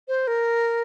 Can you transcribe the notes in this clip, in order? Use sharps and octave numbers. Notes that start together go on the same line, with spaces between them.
C5
A#4